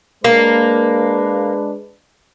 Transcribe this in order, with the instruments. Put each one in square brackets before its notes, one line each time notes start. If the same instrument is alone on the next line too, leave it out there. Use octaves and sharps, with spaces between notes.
[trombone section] G#3 D4 B4 [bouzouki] A#3